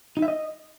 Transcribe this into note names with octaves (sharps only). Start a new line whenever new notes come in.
D#4
E5
D#5